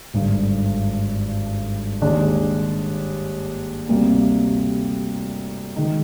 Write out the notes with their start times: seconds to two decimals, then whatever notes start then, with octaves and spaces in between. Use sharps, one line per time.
0.14 G#1 G2 D3
2.01 D#2 D#3 G#3 D4
3.89 D2 C3 G3 A#3
5.76 D#3 G#3 D#4